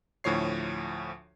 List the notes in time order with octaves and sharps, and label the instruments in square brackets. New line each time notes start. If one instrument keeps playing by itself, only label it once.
[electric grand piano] D2 A2 F3 C#5 C7